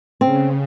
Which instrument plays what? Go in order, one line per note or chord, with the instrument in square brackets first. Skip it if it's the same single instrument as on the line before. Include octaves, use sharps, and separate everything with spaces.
[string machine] C#3 [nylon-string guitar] C4